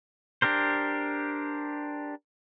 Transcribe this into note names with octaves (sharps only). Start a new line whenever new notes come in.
D4 G4 A#4 C5